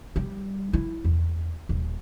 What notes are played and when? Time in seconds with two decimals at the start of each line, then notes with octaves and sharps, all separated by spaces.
0.16 G3
0.73 E4
1.05 E2
1.69 D#1